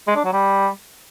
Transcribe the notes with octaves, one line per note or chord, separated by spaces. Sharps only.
G#3
D4
F#3
G3